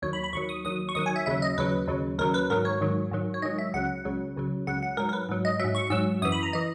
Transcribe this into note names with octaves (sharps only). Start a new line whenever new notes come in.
D#2 D#3 F#3 C#5
B5
B5
D#2 D#3 F#3 C#6
D#6
D#2 D#3 F#3 D#6
C#6
D#2 D#3 F#3 D#6
G#5
E5
D#2 C#3 F#3 E5
D#5
D#2 C#3 F#3 B4
D#2 C#3 F#3
D#2 C#3 F#3 A#4
B4
G#2 D#3 F#3 A#4
C#5
G#2 D#3 F#3
G#2 D#3 F#3
C#5
G#2 D#3 F#3 D#5
E5
C#2 C#3 F#3 F#5
C#2 C#3 F#3
C#2 C#3 F#3
C#2 C#3 F#3 F#5
F#5
G#2 F#3 A#4
A#4
B4
G#2 F#3
D#5
G#2 F#3 E5
C#6
G#2 F#3 E6
F#2 E3 D#6
B5
A#5
E3 D#5